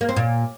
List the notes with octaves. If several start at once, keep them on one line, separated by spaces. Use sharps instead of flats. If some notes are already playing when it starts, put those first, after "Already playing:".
A#3
C4
A#2